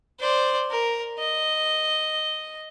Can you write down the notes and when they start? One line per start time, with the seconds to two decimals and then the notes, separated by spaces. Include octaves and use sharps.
0.20 C5 D5
0.70 A#4
1.19 D#5